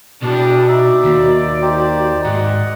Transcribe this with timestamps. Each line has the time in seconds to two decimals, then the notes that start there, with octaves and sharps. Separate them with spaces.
0.23 E2 B2 G3 D4 F#4
0.68 D#4 D5 E5
1.04 D#2
1.62 D#4 G4 C5
2.25 G#2 D#5 F#5